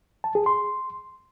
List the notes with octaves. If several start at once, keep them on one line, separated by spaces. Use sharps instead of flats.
A5
G#4
C6